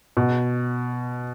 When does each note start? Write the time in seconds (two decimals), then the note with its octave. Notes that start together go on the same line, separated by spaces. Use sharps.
0.17 B2